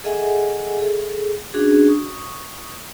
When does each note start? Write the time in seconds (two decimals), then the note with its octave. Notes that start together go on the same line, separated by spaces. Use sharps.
0.04 G#4 A4 D#5 E5 F#5 G#5
0.79 G#4 A4
1.54 C#4 D4 F#4 G#4
1.89 C#6 D#6